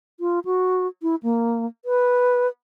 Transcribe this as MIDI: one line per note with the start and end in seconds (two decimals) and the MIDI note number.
0.20 0.39 65
0.45 0.87 66
1.02 1.15 64
1.23 1.66 58
1.85 2.48 71